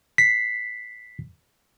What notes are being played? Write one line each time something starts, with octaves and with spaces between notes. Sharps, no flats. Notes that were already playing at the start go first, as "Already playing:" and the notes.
B6 C7